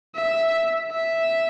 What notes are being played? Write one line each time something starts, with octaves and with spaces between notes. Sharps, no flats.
E5
E5